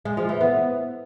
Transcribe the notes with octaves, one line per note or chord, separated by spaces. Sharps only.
G#3
F3
E3
B3